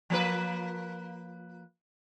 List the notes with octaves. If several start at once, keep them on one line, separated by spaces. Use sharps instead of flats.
F3 A#3 B4